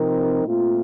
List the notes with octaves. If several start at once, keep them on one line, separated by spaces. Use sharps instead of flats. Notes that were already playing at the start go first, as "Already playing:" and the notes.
Already playing: C3 F3 C4 D#4 A#4
A#2 A3 C4 F4